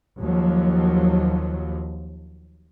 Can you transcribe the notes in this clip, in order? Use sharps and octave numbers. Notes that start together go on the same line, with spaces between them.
D#2 F3 F#3